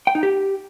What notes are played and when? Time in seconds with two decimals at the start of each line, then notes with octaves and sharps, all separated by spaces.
0.07 G5
0.15 D#4
0.23 G4